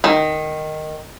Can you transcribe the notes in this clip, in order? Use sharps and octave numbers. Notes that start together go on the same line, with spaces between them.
D#3